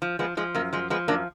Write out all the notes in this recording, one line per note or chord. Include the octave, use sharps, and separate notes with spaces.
F3
F3 G#3 B3
F3 G#3
F#2 A#3
F3 G#3
F3 G#3 B3
F#2 A#3 D4